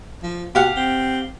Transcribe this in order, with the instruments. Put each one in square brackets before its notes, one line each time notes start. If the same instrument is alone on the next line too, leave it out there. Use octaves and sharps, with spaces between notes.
[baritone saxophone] F3
[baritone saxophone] B2 [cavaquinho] G4 F5 F#5
[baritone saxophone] C4